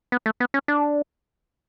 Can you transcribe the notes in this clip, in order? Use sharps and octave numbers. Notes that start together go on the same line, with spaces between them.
B3
A3
B3
C#4
D4